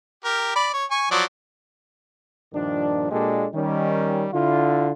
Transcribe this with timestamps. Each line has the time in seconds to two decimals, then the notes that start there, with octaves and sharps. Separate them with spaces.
0.24 G4 A#4
0.55 D5 B5
0.73 C#5
0.91 G#5 C#6
1.11 F3 F#3 D5
2.53 G2 A#2 D#3 F3 D4
3.11 A#2 G#3 A#3 D4 G4 A4
3.54 D#3 G3 C#4
4.33 D3 E4 F4